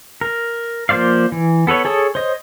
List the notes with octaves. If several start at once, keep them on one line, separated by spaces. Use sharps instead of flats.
A#4
F3 A#3 C5 D5 F5
E3
B3 A4 B4 C#5
G#4 A4 C#5 A5 D#6
C5 C#5 D#5